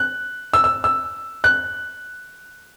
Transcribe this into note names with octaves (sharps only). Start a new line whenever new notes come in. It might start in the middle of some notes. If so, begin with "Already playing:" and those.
Already playing: F#6
E6
E6
E6
F#6